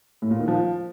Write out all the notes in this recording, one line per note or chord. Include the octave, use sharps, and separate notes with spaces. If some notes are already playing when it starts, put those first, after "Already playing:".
A2
A#2
D#3
F3